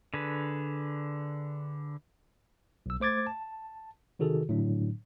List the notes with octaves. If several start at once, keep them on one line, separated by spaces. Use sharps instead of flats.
D3 G#4 B4
B1 E6
A3 C5 D6 G#6 A6
A5
C3 D#3 F#4 G#4 A4
A2 D3 F#3 D4